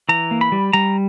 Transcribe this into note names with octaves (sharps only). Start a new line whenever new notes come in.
E3 A#5
A#3
B5
G3
G3 A#5